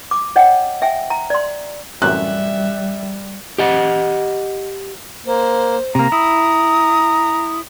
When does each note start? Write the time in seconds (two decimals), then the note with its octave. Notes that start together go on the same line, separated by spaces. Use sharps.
0.11 D6
0.36 C#5 D#5 F#5 G5
0.82 E5 G5 G#5
1.10 A#5
1.30 D5 C6
2.02 A1 F#2 C3 G3 E5 F#6
3.58 G4 D#5 F#5
5.26 A#3 C5
5.95 C3 A#3 A#5
6.12 E4 D#6